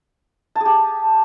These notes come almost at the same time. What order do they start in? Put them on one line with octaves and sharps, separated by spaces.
A5 G#4 G4